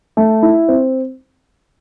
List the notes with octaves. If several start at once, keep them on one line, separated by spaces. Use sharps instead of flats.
A3
E4
C4